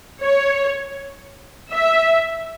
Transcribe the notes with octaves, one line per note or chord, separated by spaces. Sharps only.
C#5
E5